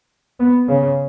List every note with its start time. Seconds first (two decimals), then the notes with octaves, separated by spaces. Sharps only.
0.40 B3
0.68 C#3